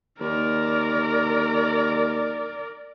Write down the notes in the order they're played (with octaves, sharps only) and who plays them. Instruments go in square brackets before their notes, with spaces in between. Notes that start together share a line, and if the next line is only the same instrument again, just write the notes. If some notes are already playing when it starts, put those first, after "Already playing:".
[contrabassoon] D#2 [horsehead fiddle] A#4 D5